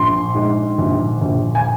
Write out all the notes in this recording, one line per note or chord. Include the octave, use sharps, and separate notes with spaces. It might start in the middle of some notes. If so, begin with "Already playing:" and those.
Already playing: A#1 C6
G#2
A#1
A#1
G#5